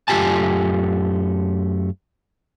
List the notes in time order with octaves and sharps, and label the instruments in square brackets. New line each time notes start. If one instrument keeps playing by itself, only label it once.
[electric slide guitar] F#2 A3 F4 G4 G#5 A5